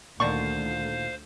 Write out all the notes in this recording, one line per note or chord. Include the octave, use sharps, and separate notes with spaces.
D2 A#2 D3 D#3 C5 D5 F5 C#6